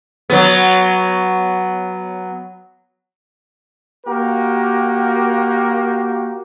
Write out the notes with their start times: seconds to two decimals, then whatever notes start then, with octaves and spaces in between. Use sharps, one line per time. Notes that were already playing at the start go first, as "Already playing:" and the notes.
0.30 F#3 B3
4.06 A#3 F#4 G4 A#4